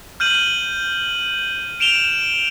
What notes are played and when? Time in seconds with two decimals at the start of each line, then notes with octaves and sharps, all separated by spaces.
0.20 F6 G6 D#7 F#7
1.80 D7 E7 F7 G7